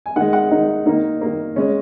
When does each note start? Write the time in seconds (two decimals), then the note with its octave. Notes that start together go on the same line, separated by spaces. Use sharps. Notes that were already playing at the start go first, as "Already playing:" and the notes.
0.06 G#5
0.16 D#3 G#3 F#5
0.33 F#5
0.51 D#3 G#3 D#4
0.86 D#3 A#3 D#4
1.21 D#3 A#3
1.56 C#3 G#3 C#4